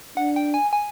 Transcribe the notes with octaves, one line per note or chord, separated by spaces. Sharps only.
D4 F#5
G5
G#5
G#5